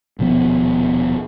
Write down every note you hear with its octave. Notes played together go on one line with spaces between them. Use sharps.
D#1 B2 F3 B3